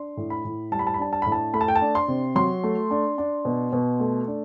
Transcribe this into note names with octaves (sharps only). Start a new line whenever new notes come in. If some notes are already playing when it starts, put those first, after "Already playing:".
Already playing: D4 C6
A2
B5
A2
G3 A5
B5
A5
B5
D4 A5
A5
A2 B5
A5
A3 B5
A5
G5
A5
D4
C6
C3
F#3 C6
A3
D4
D4
B2
B2
A3
D4